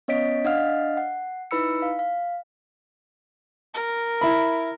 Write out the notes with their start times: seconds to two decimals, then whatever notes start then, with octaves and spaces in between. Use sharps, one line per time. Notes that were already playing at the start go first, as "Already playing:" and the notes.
0.08 B3 C#4 C#5 D#5 B6 D7
0.45 D4 D#5 F5 F#5 F6
0.97 F#5
1.51 D#4 E4 B4 B5 E6 C#7
1.82 F5
1.99 F5
3.74 A#4
4.21 E4 B5